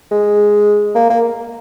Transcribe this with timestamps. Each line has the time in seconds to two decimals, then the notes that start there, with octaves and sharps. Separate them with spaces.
0.11 G#3
0.95 A#3
1.10 A#3